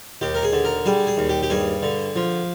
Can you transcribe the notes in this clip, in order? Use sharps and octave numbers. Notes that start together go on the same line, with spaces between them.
D#2 G4
A#4
G#4
D3
A#4
G3 G#4
G#4
D#2
G4
G4
G2 G#4
D3
F3